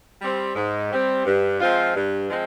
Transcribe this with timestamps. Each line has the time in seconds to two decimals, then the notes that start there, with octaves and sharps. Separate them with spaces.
0.20 G3 C4
0.55 G#2
0.90 G3 C4
1.25 G2
1.59 F3 G#3 C4 F4
1.94 G2
2.29 F3 G#3 C4